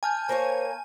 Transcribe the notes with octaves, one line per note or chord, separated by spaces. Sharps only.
G#5 A5 F6 G6
A#3 A#4 C5 C#5